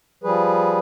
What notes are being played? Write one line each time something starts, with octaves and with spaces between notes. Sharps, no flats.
F3 G3 G#4 B4